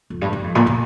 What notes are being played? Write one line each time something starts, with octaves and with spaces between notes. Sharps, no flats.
F2
G2
G2
F2
A#2
A#2